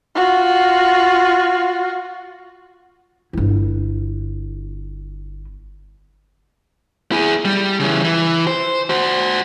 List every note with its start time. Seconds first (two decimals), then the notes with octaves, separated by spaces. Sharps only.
0.15 F4 F#4
3.33 G1 E4
7.12 E4 G#4
7.45 G3
7.80 C#3 E3
8.04 E3
8.47 C5
8.90 F#4 C5